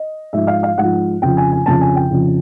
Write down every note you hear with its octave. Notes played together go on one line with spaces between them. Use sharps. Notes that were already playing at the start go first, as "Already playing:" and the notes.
Already playing: D#5
G#2 F3 E5
F5
F5
G#2 F3 F#5
F2 C#3 F3 G5
G#5
G#5
F2 C#3 F3 A5
G#5
G5
F2 C#3 F3